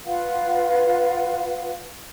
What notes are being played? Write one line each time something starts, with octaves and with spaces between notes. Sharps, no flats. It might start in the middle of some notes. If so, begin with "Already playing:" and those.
F4 B4 F5 F#5